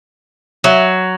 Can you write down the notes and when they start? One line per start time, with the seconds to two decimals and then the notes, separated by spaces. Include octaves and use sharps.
0.64 F#3 E5